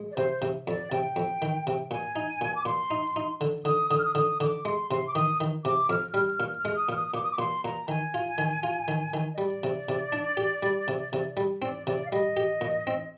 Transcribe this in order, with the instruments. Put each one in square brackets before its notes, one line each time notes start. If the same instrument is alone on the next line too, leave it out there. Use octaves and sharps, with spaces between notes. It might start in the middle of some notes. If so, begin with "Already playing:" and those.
Already playing: [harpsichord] G#3
[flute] D5
[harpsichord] C3 [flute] C5
[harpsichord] C3
[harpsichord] F2 [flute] D5
[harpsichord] C3 [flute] G5
[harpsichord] F2
D#3
C3
[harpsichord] A#2 [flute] G#5
[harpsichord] D#4
A#2
[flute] D6
[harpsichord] A#2 [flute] C6
[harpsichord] D#4
D#4
D3
[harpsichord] D3 [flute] D#6
[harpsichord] D3 [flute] D#6
[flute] F6
D#6
[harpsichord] D3 [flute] D#6
[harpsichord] D3 [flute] D6
[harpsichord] G#3 [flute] C6
[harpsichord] C3 [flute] C6
[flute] D6
[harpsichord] D#3 [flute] D#6
[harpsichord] D#3
[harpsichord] C3 [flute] D6
[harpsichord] F2 [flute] F6
[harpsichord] G3 [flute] F6
[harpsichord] A#2 [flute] F6
[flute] F6
[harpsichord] G#3
[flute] D#6
[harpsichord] A#2 [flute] F6
[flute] D#6
D#6
[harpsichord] A#2 [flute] D6
[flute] D#6
D6
[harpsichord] A#2 [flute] C6
[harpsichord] A#2 [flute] A#5
[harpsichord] D#3 [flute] G#5
[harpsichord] F4
D#3
F4
D#3
D#3
[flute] D#5
[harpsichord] G3 [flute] D5
[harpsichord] C3
C3
D4
G4
G3
C3
C3
G3
[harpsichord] C4 [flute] D5
[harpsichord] C3 [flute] D5
[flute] F5
[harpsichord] G3 [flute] D#5
[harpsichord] G4
A#2
C4